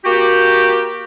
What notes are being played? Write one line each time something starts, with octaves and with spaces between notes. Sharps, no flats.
A#3 F#4 G4